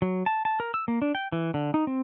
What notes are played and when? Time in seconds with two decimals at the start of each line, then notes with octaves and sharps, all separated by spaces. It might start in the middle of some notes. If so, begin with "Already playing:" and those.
0.02 F#3
0.26 A5
0.45 A5
0.60 A#4
0.74 E6
0.88 A#3
1.02 D4
1.15 G5
1.32 E3
1.54 D3
1.74 D#4
1.87 C4